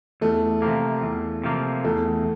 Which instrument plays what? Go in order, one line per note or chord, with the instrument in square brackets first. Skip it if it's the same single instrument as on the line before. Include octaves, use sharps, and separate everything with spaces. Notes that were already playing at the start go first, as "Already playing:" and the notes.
[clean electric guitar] E2 [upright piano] A3
[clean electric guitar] C3 F3 A#3
E2
C3 F3 A#3
[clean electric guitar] E2 [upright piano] A3